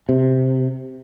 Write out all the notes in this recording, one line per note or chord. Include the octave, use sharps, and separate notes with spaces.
C3